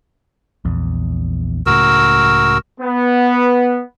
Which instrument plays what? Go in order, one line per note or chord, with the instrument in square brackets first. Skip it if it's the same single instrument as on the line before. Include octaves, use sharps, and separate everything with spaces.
[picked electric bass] A#1 E2
[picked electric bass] C#2 A2 C#3 [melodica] F#4 A#4 E6
[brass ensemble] B3